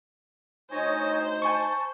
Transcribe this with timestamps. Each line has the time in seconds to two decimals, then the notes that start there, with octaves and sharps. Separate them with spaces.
0.71 D2 D#4 C5 C#5 D#5 G#5
1.42 G#5 A5 C#6